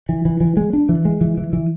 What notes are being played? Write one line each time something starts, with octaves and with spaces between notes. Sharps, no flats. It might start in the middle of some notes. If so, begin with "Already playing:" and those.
E3
E3
E3
G#3
D4
E3
G#3
E3
E3
E3